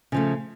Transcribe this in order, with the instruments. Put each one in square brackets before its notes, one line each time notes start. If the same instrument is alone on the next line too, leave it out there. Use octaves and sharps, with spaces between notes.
[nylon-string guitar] C#3 F3 A3